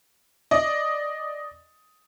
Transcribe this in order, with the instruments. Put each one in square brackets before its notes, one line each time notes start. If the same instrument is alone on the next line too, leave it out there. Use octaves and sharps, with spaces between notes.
[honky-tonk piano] D5 D#5